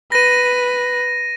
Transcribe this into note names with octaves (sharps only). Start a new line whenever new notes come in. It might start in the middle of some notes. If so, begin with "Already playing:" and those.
B4 A#6 D#7